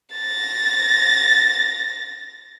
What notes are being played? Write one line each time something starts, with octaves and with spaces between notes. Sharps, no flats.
A6 A#6